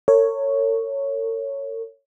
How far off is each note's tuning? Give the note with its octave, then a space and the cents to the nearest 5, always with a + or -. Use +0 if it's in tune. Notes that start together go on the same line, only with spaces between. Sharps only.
A#4 -45 C#5 +0